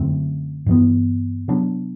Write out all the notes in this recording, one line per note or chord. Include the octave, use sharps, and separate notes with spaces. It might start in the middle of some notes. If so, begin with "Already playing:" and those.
Already playing: F#2 D3 A3 C4
G2 E3 B3
C3 F#3 B3 D4